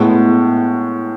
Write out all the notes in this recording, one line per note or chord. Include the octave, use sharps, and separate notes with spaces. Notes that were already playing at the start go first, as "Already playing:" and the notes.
Already playing: A2 G#3 B3